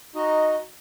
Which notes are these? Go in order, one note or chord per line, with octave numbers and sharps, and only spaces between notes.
D#4 F#4 D#5